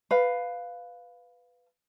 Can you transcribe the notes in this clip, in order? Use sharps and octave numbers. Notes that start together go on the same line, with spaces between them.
B4 F5